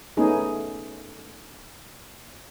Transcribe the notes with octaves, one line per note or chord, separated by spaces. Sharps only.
A3 B3 C#4 D#4 G#4